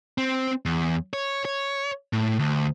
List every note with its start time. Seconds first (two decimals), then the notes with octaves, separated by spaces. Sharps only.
0.18 C4
0.66 E2
1.13 C#5
1.45 C#5
2.13 A2
2.39 D2